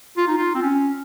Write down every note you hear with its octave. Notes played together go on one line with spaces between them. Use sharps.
F4
D#4
F4
C4
C#4